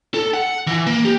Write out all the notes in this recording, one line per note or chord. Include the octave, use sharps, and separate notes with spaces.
A4
F#5
E3
A#3
G4